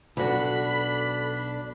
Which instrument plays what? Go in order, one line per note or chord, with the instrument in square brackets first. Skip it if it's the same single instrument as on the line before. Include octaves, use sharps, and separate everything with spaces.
[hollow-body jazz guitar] B1 F#4 [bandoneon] D4 [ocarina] A4 [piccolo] B5